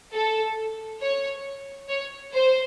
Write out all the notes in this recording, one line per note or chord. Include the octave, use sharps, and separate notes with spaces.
A4
C#5
C#5
C5